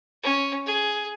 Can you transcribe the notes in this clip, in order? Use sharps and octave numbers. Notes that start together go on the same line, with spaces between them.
C#4
G#4